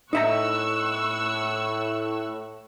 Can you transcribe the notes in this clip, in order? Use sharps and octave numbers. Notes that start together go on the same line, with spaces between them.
A2 D#4 E5 A#5 C#6 E6 F#6